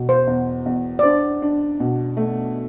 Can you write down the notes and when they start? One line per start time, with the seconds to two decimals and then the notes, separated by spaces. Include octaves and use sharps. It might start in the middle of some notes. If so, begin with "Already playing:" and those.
Already playing: E1 B2
0.09 C5
0.27 E2
0.66 E2
0.99 D5
1.03 D4 C5
1.42 D4
1.80 B2
2.17 A3